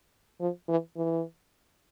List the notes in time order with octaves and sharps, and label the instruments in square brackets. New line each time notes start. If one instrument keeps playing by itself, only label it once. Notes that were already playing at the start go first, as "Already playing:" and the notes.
[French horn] F3
E3
E3